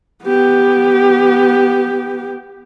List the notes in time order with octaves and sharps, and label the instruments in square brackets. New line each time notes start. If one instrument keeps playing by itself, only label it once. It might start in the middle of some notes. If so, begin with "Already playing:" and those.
[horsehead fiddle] B3 G4